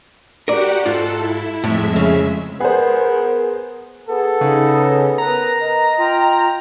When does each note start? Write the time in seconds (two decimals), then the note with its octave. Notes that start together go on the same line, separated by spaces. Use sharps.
0.48 F#4 G4 A#4 D5 F#5
0.86 G#2 F4 A4
1.18 E4
1.64 F2 A2 G#3 E5
1.96 C#3
2.60 B3 G#4 A#4 C5
4.09 B3 G#4 A4
4.41 C#3 D#4
5.18 A#4 B4 A#5
5.60 D#5
5.99 F4 G5